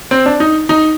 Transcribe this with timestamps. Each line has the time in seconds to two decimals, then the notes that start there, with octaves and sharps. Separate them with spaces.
0.11 C4
0.26 D4
0.40 D#4
0.69 D#4